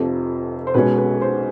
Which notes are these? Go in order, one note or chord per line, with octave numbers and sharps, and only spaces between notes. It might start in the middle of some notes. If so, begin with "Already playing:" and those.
Already playing: F1 F2 C3 F3
C5
B1 B2 G#3 C#4 B4
B4
C5